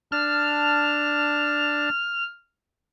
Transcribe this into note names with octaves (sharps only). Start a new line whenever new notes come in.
D4 A5 F6